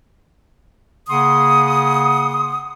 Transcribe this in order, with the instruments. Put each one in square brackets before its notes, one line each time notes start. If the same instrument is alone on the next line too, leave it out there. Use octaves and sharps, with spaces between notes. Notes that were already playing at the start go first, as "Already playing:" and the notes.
[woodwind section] C#3 A#3 F#5 C6 D#6